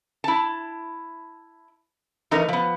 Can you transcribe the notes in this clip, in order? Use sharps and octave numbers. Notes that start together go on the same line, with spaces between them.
E4 A5
E3 A3 D#4 A#4
F3 B3